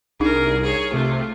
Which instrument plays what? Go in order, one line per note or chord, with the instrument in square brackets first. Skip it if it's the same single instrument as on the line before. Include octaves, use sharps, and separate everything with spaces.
[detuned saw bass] C2 [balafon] D4 D#4 [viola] G#4 A#4
[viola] G#4 C#5
[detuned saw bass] C3 [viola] A3 F4